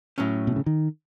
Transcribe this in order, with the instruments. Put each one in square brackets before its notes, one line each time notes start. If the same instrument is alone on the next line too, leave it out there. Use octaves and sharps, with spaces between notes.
[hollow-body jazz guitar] A2 F#3 C#4
[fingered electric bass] B2
C#3
D#3